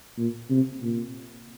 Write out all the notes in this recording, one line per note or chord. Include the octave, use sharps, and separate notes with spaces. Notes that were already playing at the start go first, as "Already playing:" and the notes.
A#2
C3
A#2